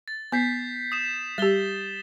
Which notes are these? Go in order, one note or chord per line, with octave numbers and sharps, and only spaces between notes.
A6
B3 G6 B6 C7
D#6 B6 E7
G3 G4 A6 G7